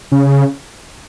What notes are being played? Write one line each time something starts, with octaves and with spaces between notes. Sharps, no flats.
C#3